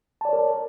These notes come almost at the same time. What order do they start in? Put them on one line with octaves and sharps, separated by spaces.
A5 D5 C#5 A#4